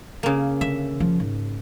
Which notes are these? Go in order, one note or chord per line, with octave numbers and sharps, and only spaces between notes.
C#3 A#3
D3 E5
F3
G#2